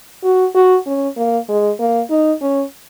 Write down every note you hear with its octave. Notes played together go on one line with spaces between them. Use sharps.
F#4
F#4
C#4
A#3
G#3
A#3
D#4
C#4